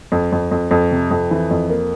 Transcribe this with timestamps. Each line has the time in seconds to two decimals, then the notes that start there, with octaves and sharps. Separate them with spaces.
0.12 F2
0.32 F2
0.51 F2
0.71 F2
0.91 C3
1.11 F2
1.31 E3
1.51 F2
1.69 A#3